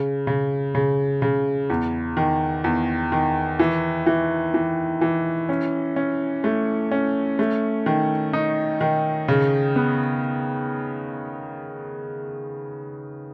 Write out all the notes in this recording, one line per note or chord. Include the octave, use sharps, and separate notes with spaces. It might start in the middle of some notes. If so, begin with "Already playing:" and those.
Already playing: C#3
C#3
C#3
C#3
E2
D#3
E2
D#3
E3
E3
E3
E3
C#4
C#4
A3
C#4
A3
D#3
D#4
D#3
C#3
B3